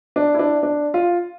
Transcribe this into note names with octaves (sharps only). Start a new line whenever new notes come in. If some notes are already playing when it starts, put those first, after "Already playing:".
D4
E4
D4
D4
F4